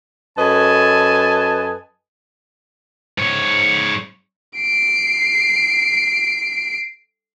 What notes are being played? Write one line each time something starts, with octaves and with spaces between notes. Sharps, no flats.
F#2 A4 B4 D#5 G#5 A5
G#2 C#5
C7 D7